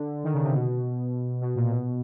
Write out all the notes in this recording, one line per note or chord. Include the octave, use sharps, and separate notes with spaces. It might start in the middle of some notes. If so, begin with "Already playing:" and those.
Already playing: D3
D#3
C#3
C3
B2
B2
A#2
B2